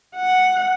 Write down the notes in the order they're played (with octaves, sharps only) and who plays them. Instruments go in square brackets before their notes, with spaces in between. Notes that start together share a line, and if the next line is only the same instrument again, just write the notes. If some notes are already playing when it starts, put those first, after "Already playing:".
[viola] F#5